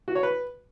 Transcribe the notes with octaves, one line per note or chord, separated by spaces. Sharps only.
F#4
C#5
B4